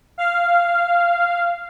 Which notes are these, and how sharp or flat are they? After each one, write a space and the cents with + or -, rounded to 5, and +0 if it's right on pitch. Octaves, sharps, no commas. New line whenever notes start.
F5 -10